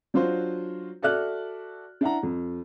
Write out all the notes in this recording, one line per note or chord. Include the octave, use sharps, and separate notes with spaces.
F#3 D4 F4 F#4 C5
F#4 A4 D5 E5 F6 F#6
D4 E4 F#5 A#5
F2